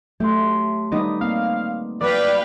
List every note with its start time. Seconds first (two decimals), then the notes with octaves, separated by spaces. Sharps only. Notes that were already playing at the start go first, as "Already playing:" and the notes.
0.20 F#3 A3 G4 E5 C6
0.92 D#3 G3 B3 D#4 D#5 D6
1.21 A#3 C4 F5
2.01 F#3 B4 D5 F5 G5